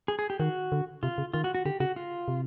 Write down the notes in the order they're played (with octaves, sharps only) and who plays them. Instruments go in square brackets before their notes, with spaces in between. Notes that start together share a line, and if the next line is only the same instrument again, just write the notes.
[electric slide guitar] G#4
G#4
G4
[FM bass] D#3 [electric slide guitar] F#4
[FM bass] D3
[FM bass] C3 [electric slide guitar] F4
[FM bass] C#3
[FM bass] D#3 [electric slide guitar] F4
[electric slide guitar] F#4
F#4
[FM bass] D3 [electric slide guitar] G4
[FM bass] C#3 [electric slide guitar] F#4
[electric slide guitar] F4
[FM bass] C3